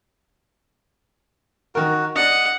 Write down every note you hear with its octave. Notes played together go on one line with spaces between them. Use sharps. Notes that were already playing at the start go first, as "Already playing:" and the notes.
D#3 F#4 A#4
D4 D#5 F#5